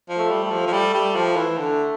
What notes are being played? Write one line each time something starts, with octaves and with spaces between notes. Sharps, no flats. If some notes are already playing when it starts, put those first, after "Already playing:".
F3
A3
G3
A3
F3
F3
G3 A3
G3
F3
E3
D3 A3